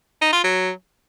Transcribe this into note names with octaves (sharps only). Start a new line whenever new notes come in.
D#4
F4
F#3